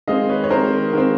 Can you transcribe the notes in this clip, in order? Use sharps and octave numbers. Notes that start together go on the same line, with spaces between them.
D#3 G#3 C4 D#5 F5
B4 C#5
C#5
D#3 G#3 C4 A#4 C5
D#3 G#3 C4